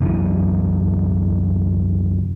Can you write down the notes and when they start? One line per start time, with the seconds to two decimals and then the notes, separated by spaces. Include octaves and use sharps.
0.01 C2 F#2 D3 E3